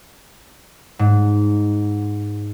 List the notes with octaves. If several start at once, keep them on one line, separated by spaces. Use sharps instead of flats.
G#2